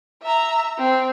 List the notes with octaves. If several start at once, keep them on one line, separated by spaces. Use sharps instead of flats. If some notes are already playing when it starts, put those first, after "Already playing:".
E5 A#5
C4